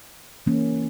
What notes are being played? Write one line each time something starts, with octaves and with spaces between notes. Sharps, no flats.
E3 A#3 C#4